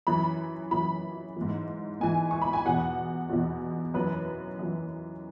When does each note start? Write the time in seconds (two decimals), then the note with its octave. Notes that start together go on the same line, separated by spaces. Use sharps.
0.07 F#2 E3 B5
0.71 F#2 E3 B5
1.37 G#2 E3
2.00 G#2 E3 G#5
2.31 C#6
2.42 B5
2.53 G#5
2.65 E2 B2 F#5
3.30 E2 B2
3.94 F#2 E3 B4
4.59 F#2 E3